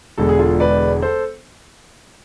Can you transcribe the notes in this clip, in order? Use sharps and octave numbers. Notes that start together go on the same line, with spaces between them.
E1 E2 D3 G#3 A4
G#4
F4 A4
B4 D5
A4 C5